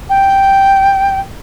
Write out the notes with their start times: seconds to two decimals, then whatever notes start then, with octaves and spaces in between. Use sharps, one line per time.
0.09 G5